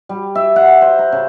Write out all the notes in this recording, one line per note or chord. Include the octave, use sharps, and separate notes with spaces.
G3
E5
F#5
C5
A#5
C#3